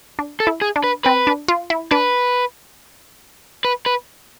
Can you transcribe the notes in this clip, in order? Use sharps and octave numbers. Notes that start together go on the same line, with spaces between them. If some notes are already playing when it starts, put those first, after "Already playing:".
D4
A4
E4
G#4
D4
B4
C4 B4
D4
F4
E4
D4 B4
B4
B4